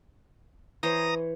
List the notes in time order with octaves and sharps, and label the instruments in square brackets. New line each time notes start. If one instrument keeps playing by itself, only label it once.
[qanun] E3 C5 C#5 [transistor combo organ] A#5 D#6